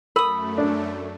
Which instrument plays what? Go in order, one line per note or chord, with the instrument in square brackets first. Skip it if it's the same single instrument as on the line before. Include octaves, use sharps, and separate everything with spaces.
[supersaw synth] F#2 A3 [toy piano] A#4 [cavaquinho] B5 D#6
[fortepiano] D4